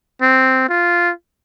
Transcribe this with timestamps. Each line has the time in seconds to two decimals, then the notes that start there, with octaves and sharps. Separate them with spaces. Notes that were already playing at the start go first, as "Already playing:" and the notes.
0.22 C4
0.69 F4